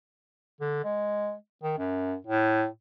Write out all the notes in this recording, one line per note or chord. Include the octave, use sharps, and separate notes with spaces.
D3
G#3
D#3
F#2
A2